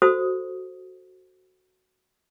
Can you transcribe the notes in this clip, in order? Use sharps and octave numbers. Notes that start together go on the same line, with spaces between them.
F#4 A4 C5 D#6